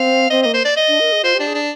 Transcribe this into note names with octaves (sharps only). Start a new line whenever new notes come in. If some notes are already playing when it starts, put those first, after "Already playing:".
Already playing: C4 F5
C4 D#5
A#3 D#5
C5
D5
D#5
D4
A#4
G#4
F4 C5
D4 G4
G#4
D4